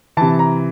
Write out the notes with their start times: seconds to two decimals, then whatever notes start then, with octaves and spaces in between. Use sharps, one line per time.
0.17 C3 E3 A5
0.39 A#5